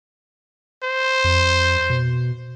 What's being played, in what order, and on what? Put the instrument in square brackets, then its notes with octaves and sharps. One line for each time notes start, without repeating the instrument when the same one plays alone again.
[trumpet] C5
[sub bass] F2
B2